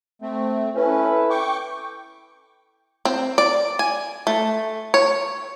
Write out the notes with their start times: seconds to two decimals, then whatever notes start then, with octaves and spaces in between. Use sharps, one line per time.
0.22 A3 C4
0.75 C#4 E4 A4 B4
1.30 G5 C#6 D6
3.05 C4
3.38 D5
3.79 G#5
4.27 A3
4.94 C#5